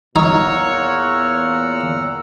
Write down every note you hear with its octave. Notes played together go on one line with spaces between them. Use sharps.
E2 A#2 D#4 C#5 F#5 A#5 E6 F6